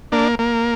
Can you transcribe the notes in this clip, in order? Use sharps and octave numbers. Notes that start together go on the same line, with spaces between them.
A#3 D4
A#3